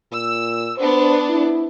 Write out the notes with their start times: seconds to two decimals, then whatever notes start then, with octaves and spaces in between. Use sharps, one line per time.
0.12 A#2 E6
0.78 B3 D4 C5
1.29 E4